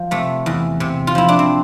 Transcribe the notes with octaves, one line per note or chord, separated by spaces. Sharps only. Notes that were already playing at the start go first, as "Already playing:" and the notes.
Already playing: F3
C3 A3
E2
C3
F4
F3 E4
D4
C4